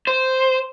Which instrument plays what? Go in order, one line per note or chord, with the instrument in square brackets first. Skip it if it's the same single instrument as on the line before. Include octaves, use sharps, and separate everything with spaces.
[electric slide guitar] C5